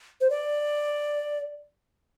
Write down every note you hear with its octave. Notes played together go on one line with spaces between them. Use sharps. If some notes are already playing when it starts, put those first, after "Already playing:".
C5
D5